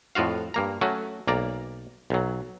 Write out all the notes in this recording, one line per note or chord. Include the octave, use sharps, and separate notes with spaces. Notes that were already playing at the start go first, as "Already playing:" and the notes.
F2 A2 F4 F#4 F5
G2 A#3 A#5
F#3 A3 C#4 F#4
B1 A#3 D5 A#5
B1 F#3